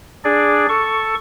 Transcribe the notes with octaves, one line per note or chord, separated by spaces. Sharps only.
D4 G#4 D5
A4 C#6